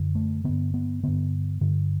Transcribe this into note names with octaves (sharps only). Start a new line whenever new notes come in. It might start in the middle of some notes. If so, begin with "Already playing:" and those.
Already playing: F#2 D3
A3
G2 D3 B3
B3
G2 D3 B3
G2 D3